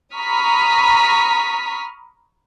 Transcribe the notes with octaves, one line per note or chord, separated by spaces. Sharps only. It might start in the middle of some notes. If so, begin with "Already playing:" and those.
A#5 B5 C#6 D#6 F6 B6